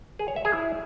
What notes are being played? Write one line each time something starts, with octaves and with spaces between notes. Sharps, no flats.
G#4
C#5
E5
G#4
E4